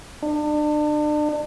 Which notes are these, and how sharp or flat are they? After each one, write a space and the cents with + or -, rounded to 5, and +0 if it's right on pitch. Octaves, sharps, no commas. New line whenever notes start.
D4 +35